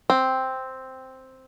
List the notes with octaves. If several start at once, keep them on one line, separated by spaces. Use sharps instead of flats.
C4